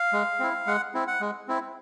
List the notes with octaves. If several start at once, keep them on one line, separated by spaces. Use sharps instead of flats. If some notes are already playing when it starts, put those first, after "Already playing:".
Already playing: F5
G#3
C4 E4
G#3 F#5
C4 E4
F#5
G#3
C4 E4